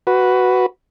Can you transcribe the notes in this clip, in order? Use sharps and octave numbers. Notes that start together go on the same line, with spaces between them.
F#4 B4